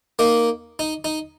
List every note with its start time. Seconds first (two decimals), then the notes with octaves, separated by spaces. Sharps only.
0.19 A#3 D#4
0.79 D#4
1.04 D#4